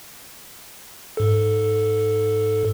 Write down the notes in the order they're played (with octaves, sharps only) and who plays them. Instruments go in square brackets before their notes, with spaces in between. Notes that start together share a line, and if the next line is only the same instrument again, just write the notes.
[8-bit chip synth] G#2 A4